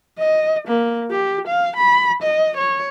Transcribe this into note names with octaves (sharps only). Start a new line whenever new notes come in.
D#5
A#3
G4
F5
B5
D#5
C#5